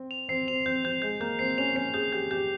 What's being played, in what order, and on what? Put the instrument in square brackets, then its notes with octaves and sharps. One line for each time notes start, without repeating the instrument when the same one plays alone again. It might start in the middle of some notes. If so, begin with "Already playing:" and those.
Already playing: [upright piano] C4
[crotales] F7
[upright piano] C4 [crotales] C7
[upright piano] C4 [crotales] F7
[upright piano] C4 [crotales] G6
[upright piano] C4 [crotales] G6
[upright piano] G#3 [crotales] G6
[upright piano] A#3 [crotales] G6
[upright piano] C4 [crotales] C7
[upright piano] C#4 [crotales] F7
[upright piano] C#4 [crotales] C7
[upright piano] G#4 [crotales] G6
[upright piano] G4 [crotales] G6
[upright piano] G4 [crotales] G6